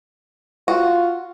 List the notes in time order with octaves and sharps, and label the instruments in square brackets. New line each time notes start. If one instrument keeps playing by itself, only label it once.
[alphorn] F4 [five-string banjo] F#4